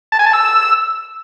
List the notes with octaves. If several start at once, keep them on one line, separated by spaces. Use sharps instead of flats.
A5
G#5
A5
E6